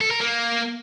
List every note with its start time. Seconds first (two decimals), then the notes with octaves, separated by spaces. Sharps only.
0.01 A4
0.11 A#4
0.20 A#3